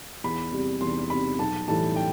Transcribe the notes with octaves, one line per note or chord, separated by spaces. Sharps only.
E2 B5
C3 G3
E2 C6
C3 G3 B5
B1 A5
A2 E3 G3 A5
G5